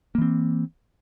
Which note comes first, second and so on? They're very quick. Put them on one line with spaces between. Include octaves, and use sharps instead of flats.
A#3 E3 C4